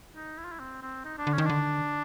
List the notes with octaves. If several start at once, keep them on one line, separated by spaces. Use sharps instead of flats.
D#4
E4
F4
E4
C4
C4
D#4
D4
D3
C#4
D#3
D3 D4